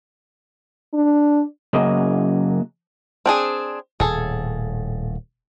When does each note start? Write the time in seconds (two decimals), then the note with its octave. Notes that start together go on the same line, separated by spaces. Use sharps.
0.93 D4
1.73 F#2 C#3 F#3 A#3 D#5
3.26 C4 D4 G#4
4.00 D#1 A2 G#4 A4